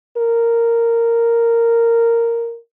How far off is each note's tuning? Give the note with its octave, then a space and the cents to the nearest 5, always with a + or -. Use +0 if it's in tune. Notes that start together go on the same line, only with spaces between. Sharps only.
A#4 -10